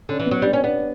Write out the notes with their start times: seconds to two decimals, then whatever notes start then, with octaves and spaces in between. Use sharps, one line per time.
0.09 D3 C#4
0.20 E3
0.26 B3
0.31 F#3
0.42 G3 D4
0.53 C#4 D4
0.64 B3 D4